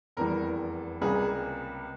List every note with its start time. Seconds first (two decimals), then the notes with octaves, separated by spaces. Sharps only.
0.17 F1 E2 E3 G3 A#4
1.01 C#2 C3 G3 A#3 G#4